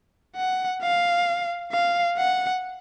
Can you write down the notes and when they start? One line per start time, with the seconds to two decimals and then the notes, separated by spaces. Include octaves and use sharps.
0.36 F#5
0.82 F5
1.72 F5
2.17 F#5